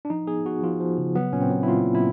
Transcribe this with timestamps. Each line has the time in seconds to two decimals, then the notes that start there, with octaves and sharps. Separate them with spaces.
0.05 D4
0.10 F3 D#4
0.27 B3 G#4
0.45 B3 F#4
0.63 F3 F4
0.80 F3
0.98 C#3
1.16 F#3 B3
1.33 A#2 C#4
1.42 C4
1.50 F#3
1.63 E4
1.68 A#2 F4
1.86 A#2
1.95 E4